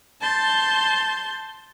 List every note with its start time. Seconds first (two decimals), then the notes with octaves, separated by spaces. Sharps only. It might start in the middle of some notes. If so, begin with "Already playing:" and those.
0.21 A5 C6 G6 A6